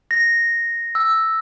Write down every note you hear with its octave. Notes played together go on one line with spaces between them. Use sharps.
A#6
E6